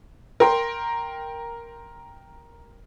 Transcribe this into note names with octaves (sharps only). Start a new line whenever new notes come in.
A#4 G5 C6